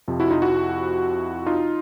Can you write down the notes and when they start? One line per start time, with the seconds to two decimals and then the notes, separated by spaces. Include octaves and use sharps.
0.08 F2 C3 F3
0.20 E4 F#4
0.31 D#4 F4
0.42 E4 F#4
1.46 D#4 F4